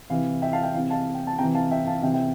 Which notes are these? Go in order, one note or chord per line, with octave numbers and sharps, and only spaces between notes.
C3 E3 F5
E5 G5
F5 A5
E5 G5
C3 E3 F5
F5 A5
G5
A5
C3 E3 G5 A#5
F5 A5
E5 G5
F5 A5
C3 E3 E5 G5
E5 G5